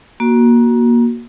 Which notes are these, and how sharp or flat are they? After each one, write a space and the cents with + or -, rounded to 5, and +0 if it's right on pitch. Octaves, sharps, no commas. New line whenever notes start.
A#3 +25 F#4 +0